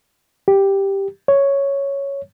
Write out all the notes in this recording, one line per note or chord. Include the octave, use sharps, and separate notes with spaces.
G4
C#5